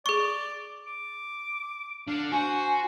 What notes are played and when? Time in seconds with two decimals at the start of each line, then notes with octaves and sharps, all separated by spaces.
0.06 G#4 D5 C#6
0.87 D6
2.08 D3 F5
2.32 F#4 C5 G#5